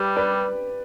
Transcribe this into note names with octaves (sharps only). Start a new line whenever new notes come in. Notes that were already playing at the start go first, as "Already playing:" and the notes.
Already playing: G3 G4 B4
B4 D5